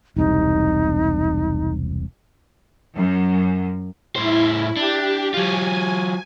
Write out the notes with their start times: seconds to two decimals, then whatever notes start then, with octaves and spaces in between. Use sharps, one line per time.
0.17 E1 C2 C3 D#4
2.96 F#2
4.16 A2 E4 C5
4.77 D4 G4
5.34 F#3 F4 G#5